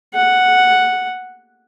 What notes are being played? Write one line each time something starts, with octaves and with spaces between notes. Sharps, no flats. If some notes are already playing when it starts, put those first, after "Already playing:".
F#5